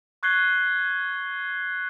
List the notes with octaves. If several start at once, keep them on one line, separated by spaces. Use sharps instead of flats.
C#6 F#6 G#6 C7 G7